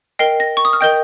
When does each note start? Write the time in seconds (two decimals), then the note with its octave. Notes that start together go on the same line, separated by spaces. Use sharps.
0.19 A#4 D#5 G5 C7
0.40 A#6
0.57 C#6
0.65 D#6
0.73 F6
0.81 A#4 D#5 G5 G6